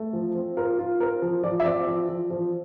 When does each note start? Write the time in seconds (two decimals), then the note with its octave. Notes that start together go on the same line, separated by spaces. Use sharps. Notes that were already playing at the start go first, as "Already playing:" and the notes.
Already playing: A3
0.13 F3
0.35 C4
0.57 F4 A#4
0.79 F4
1.00 C4 A#4
1.22 F3
1.43 F3 D5
1.60 E5
1.64 C4 D5
1.87 F3
2.09 F3
2.30 F3